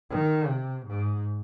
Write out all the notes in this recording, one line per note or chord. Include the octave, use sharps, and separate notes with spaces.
D#3
C3
G#2